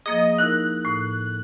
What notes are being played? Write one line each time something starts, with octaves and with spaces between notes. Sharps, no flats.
F3 A#3 G#4 D#5
D#4 E4 A#4 F#6
A2